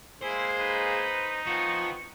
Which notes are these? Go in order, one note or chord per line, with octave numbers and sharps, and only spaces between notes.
G#3 A#3 E4 G#4 C5
D#4 B4
F3 B3 C4 C#6